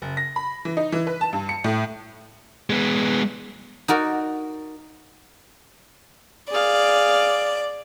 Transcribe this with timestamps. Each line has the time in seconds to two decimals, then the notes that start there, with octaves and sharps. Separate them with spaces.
0.02 F#1
0.17 A#6
0.36 B5
0.65 E3
0.77 D#4
0.92 E3
1.07 B4
1.21 A5
1.33 G2
1.49 C#7
1.64 A2
2.70 G#3 B3
3.88 D#4 F#4 A#4 D5
6.51 G#4 D5 F5